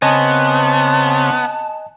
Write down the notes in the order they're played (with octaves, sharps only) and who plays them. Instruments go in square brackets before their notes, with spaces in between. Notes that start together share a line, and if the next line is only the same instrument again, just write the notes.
[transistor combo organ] C#3 C4 C#5 [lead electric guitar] B3 [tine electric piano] D#5 G#5 [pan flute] A5